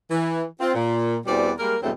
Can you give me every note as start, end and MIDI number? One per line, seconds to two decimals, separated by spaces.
0.11 0.43 52
0.60 0.70 60
0.60 0.70 65
0.74 1.17 46
1.26 1.51 40
1.26 1.51 47
1.26 1.51 52
1.26 1.51 55
1.26 1.51 60
1.26 1.51 74
1.58 1.76 55
1.58 1.76 56
1.58 1.76 58
1.58 1.76 70
1.82 1.91 40
1.82 1.91 43
1.82 1.91 47
1.82 1.91 54
1.82 1.91 57
1.82 1.91 60